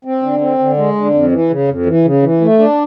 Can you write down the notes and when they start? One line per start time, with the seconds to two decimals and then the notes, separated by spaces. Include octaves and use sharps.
0.05 C4
0.22 D3
0.41 C4
0.59 D3
0.77 G#3
0.95 D3
1.14 F2
1.32 E3
1.50 C#3
1.68 F2
1.86 E3
2.05 C#3
2.22 E3
2.41 A3
2.59 D4